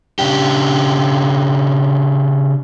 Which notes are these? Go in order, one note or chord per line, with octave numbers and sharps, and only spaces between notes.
C#3 D4 G4